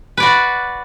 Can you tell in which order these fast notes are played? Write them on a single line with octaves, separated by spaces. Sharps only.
B4 D5 F#4